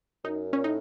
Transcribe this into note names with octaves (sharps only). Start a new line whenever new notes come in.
F#2 D#4
A#2 C#4
A2 D#4